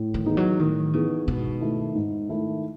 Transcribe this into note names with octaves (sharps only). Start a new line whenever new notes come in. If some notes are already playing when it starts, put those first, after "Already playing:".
Already playing: A2
D#3
E3 B3 D#4 G#4
F#3
A2 D#3
C#3 E3 B3 D#4 G#4
G#2 B2
D#3 A3 E4
G#2
D#3 A3 E4